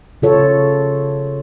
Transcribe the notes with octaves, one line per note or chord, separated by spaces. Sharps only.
C#3 F4 A4 C#5